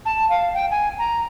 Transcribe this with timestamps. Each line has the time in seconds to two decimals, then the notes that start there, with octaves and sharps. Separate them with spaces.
0.06 A5
0.30 F5
0.54 G5
0.71 G#5
0.99 A#5